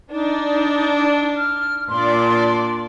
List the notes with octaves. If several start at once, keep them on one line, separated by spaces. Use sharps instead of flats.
D4 D#4
F6
A#2 D4 D5 C6